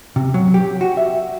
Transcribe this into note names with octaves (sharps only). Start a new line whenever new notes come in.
C3
F#3
G4
F#4
E5